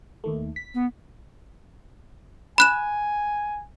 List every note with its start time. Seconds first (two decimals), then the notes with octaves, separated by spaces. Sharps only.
0.24 D#2 D#3 A3
0.56 B6
0.75 B3
2.58 G#5 B5 F#6 E7